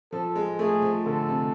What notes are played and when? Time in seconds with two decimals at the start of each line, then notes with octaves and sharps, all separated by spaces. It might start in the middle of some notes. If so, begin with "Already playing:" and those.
0.12 F3 A4
0.35 G#3
0.59 A3 G#4
0.82 F3
1.05 D3 A4
1.28 C3